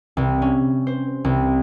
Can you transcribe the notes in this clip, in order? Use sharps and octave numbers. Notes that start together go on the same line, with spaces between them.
C2
C#4
C5
C2